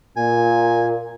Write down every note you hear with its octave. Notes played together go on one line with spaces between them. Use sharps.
A#2 G#5